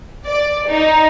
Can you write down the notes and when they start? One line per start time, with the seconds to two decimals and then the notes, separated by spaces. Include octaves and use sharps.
0.25 D5
0.69 D#4